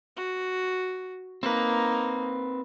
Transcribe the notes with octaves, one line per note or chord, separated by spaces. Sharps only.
F#4
A#3 C4 D#4 B4